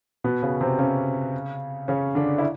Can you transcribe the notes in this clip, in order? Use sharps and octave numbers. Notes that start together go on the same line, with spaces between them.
B2 B3
C#3 C#4
C3 C4
C#3 C#4
C#3 C#4
D3 D4
E4